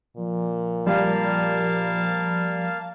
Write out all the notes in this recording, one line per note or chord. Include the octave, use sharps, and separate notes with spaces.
A#2 F3
G3 A#3 F5 A5